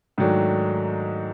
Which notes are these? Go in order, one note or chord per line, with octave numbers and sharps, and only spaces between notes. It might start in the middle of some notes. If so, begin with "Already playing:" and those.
G#2 D#3 F#3 A3 D4